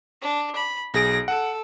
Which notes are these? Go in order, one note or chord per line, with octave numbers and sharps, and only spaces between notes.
D4
B5
B1 G#4 A#6 D7
A4 F#5